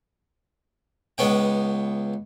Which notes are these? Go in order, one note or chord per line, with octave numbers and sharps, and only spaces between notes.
C#2 B3 C#4 G5